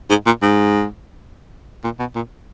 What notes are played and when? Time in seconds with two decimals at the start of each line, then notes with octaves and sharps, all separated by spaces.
0.10 G#2
0.26 A#2
0.42 G#2
1.84 A#2
2.00 B2
2.16 A#2